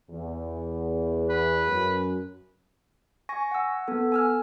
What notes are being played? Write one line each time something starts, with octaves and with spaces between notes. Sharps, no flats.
E2
B4
F#2
G#5 C#6 A#6
F#5 E6
B3 A4
G#5 E6 F6